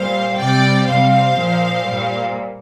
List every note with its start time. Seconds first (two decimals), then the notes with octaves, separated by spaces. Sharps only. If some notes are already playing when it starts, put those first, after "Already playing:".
Already playing: A#2 G3 C5 F5
0.39 C3 G3 D5 G5
0.87 C3 G3 C5 F5
1.36 A#2 F3
1.84 A#2 G3